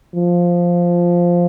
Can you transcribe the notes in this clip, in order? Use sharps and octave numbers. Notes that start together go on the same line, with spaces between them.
F3